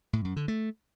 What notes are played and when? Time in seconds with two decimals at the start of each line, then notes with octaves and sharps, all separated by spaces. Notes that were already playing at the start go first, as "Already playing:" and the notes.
0.13 A2
0.25 F#2
0.36 D3
0.48 A3